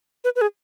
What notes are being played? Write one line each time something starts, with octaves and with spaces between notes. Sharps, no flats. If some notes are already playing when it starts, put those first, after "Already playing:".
B4
B4
G#4